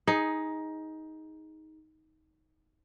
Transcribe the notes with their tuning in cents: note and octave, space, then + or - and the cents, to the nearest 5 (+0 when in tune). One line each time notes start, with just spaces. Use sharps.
D#4 +15 G#4 +0